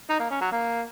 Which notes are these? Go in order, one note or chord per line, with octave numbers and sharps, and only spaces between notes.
D#4
A#3
C#4
F#3
A#3